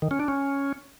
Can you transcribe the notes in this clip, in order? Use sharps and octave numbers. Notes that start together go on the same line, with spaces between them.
D#3
C#4
D4
C#4